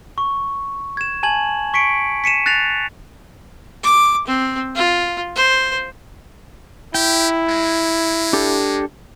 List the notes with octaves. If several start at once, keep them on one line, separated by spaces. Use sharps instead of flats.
C#6
G#6 E7
G#5 A5 G#6 F#7
C#6 B6 C#7 D7
B6 C#7 D#7 E7
F#6 A6 A#6 C7 F7
D6
C4
F4
C5
E4 G4 G5
G#3
D4 G4 A4